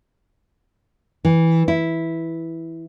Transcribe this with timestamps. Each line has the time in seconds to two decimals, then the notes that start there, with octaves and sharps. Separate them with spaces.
1.25 E3
1.68 E4